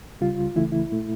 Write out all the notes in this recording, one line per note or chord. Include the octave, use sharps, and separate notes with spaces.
C#2 C#3 G3 F4
C#2 C#3 E3 A3 E4
E4
A#2 A3